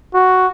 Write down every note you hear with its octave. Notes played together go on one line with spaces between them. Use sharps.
F#4